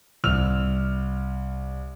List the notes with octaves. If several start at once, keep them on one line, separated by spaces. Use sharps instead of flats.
C2 E6 F6 F7